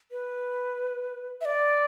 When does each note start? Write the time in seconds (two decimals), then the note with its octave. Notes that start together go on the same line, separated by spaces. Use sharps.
0.11 B4
1.41 E5
1.45 D5